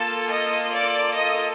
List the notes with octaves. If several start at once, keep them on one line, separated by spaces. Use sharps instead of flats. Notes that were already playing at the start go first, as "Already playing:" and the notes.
Already playing: A#3 F4 A4 A5
D#5
D5
D#5